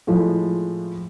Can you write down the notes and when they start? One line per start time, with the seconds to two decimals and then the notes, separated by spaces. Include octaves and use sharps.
0.07 A2 F3 G#3